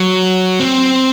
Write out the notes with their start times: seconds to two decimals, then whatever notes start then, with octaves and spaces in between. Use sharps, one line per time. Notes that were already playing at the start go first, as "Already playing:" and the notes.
Already playing: F#3
0.60 C4